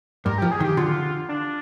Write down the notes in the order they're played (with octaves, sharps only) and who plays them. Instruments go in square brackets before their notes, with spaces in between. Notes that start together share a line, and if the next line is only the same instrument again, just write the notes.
[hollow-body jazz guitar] G2 [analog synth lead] A#4
[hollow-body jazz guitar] F3 [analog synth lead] G4
[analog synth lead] G#4
[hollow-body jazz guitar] D#3
[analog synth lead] G4
[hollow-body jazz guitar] D3 [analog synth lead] F4
[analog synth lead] D4